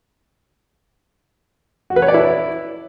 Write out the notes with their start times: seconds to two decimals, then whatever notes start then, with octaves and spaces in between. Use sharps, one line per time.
1.90 F#4
1.96 B4
2.02 C#5
2.08 D5
2.14 E4